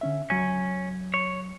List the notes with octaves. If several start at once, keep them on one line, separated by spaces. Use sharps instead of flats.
D3 C#4 E5
C#2 F#3 C#4
C#5